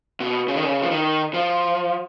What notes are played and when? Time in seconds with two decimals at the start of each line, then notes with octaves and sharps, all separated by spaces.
0.20 B2
0.48 C#3
0.55 D#3
0.63 C#3
0.82 F3
0.91 D#3
1.34 F3